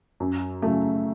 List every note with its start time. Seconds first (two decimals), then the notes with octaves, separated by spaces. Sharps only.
0.20 F#2
0.62 C#3 F#3 A3